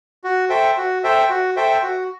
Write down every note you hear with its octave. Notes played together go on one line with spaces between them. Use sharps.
F#4
A4 C5 E5 G5
F#4
A4 C5 E5 G5
F#4
A4 C5 E5 G5
F#4